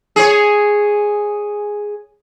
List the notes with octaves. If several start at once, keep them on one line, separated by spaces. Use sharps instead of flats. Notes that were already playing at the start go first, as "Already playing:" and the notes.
G#4 C#5